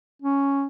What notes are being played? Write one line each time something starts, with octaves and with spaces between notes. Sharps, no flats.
C#4